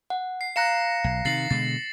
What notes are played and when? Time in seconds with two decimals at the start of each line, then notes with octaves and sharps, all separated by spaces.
0.10 F#5
0.41 C7
0.56 F5 A#5 F#6 A#6 C#7 E7
1.04 B1
1.25 C3 D#3 A6 C7 F#7
1.50 B2 D3 G#3 A6